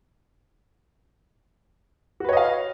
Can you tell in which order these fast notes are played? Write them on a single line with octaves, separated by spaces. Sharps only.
F#4 B4 C#5 D#5 F5